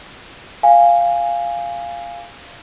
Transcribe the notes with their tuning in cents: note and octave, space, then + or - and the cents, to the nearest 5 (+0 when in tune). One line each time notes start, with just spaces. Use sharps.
F5 -5 G#5 -15